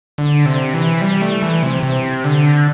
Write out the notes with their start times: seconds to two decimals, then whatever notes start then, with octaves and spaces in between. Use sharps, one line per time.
0.18 D3
0.46 C3
0.74 E3
1.01 G3
1.22 A3
1.42 E3
1.63 C3
1.83 C3
2.24 D3